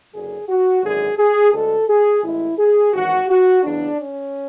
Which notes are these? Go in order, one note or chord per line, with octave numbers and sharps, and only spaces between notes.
F#1 F#2 D3 F#3 G#4
F#4
G#1 F#2 D3 F#3 G#4
G#4
D2 D3 G#3 A4
G#4
A1 A2 G#3 E4
G#4
G#1 F#2 E3 F#4
F#4
E2 C#3 F#3 D4
C#4